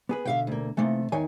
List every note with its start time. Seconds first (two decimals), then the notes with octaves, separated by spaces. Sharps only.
0.09 B3 G#4 B4
0.25 B2 D3 E5 F5 G5
0.47 D2 A#3
0.77 C3 E3 A3 A#3 D#4
1.12 E2 D#3 C#5 G#5